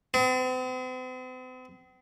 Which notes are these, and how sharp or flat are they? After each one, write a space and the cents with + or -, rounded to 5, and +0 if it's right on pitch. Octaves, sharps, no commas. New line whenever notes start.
C4 -45